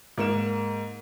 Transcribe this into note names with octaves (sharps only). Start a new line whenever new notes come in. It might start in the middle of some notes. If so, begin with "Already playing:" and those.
G#2 A#3 E7